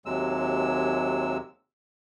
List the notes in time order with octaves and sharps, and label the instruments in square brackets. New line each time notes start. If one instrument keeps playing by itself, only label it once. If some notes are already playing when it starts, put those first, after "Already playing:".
[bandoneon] D#2 C3 F#3 G#3 E6